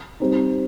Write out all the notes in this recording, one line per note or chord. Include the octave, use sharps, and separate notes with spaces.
G3 C4 D#4